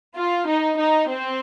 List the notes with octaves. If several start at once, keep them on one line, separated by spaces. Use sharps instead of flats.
F4
D#4
D#4
C4